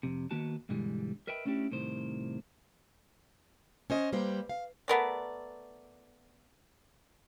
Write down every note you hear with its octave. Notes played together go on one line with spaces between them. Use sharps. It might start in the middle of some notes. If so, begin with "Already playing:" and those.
F2 C3
D#3 A#3 B3 F#4 A5
G2 B2 D3 E3 G3 G#3
A#4 B4 D#5 E5 G5 B5
A3 C#4 D4 E4 G4
C2 A2 C3 D#3 C5
C#4 C5 D#5
G3 A#3 B4 C5
F5
A3 B3 A#4 D5